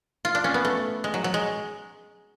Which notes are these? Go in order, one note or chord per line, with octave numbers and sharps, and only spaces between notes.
F4
D4
C#4
B3
A3
G#3
F#3
F#3
G#3